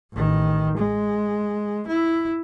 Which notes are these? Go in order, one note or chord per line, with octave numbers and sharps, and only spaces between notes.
A1 D#3
G#3
E4